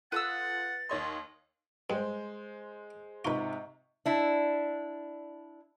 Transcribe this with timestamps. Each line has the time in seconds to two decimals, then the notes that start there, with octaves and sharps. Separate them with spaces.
0.12 F4 A4 B4 F#5 D#6 E6 A6
0.89 D#2 C#5 D#5 C6
1.90 G2 G#3 C5
3.25 G#2 C3 F4 B4 D#5 A#5 C#6
4.06 D4 E4